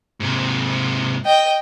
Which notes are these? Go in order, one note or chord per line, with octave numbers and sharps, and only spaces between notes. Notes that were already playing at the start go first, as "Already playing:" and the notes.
G#2 C3
D#5 G5